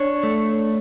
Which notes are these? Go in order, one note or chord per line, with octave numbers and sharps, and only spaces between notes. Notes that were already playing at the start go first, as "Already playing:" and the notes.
Already playing: D4 C#5
A3